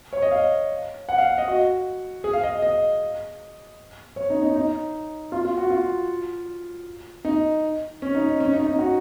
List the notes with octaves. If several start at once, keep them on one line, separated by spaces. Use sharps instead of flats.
C#5
D#5
F5
F#5
F5
D#5
F#4
G#4
F5
D#5
D#5
C#5
D#4
D#4
D#4
F4
F4
F#4
F4
D#4
C#4
D#4
C#4
D#4
D#4
F#4